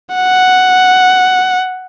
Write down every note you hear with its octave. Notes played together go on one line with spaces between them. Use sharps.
F#5